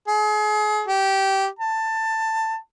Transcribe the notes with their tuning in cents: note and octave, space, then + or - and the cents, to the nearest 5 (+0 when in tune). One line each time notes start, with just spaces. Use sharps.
G#4 +35
G4 -15
A5 +15